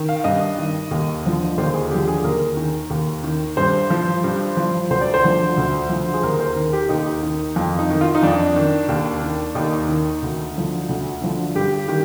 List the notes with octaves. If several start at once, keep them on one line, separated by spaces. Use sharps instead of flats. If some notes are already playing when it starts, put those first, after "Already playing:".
Already playing: D#3
F5
G2 D#5
D#3
D#2
D3 F3
D#2 C5
G#4
D3 F3 G4
G#4
D#2 A#4
D#3
D#2
D#3
G2 C5
F3
G2
F3
D2 C5
D5
C5
D3 F3
D2
D3 F3
G#4
D#2 A#4
C5
D#3 A#4
G4
D#2 D#4
D#3
F2 F4
D#4
D#3
F4
D#4
F2 D4
D#3
D#2
D#3
D#2 D#4
D#3
D2
D3 F3
D2
D3 F3
G2 G4
D#3 G4